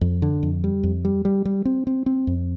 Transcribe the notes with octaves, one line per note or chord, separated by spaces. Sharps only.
F2
D3
F2
G3
F2
G3
G3
G3
C4
C4
C4
F2